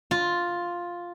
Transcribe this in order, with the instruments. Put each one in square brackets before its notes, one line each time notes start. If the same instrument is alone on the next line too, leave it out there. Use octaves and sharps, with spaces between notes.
[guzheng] F4